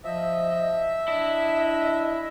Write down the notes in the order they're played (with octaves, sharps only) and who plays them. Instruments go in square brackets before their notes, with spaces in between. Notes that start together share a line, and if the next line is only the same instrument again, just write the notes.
[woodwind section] F3 D#5 [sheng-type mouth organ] E5
[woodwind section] D4 D#5 [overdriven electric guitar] E4